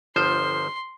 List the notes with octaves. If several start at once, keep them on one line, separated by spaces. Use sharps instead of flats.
G1 F3 C5 C6